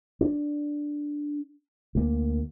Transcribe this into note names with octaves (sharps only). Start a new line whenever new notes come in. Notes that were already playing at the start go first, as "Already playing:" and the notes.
D4
D2 A#3